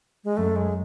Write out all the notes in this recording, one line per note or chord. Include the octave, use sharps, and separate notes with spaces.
G#3
F#2 A3
G#3